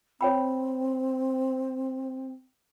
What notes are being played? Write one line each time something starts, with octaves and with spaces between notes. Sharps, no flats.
C4 C#5 G5 B5